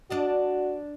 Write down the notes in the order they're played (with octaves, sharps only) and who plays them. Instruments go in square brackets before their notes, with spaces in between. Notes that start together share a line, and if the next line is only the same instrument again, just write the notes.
[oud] D4 D5 D#5 [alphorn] F#4